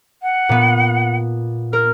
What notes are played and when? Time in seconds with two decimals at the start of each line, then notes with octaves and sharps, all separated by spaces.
0.22 F#5
0.49 A#2 B3
1.73 A#4 F6